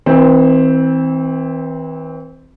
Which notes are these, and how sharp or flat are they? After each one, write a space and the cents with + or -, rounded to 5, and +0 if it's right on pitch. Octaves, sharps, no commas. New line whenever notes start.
E3 -40 C4 +0